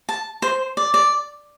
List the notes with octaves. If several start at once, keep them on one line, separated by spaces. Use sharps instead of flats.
A5
C5
D5
D5